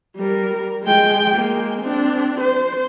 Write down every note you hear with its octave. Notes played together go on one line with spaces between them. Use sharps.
G3 A#4
G#3 G5
G#3 A#3
C4 D4
C5